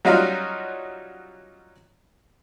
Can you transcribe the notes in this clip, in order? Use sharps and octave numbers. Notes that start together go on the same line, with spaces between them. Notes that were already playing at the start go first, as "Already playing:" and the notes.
F#3 G3 C#4 D#4 F4 F#4